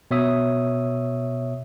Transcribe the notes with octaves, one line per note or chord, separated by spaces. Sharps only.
B2 C#5 E5 D#6